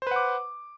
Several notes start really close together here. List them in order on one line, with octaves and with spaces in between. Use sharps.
C5 B4 F#5 D6